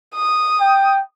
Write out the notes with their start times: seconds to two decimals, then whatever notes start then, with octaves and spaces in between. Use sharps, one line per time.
0.15 D#6
0.60 G5